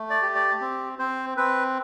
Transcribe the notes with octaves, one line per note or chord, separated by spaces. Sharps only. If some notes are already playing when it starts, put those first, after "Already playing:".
Already playing: A3
D5
G4
D5
C4
C4 C5
C4 B4